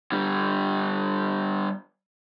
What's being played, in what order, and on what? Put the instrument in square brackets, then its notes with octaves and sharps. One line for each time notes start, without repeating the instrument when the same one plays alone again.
[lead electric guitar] D3 G3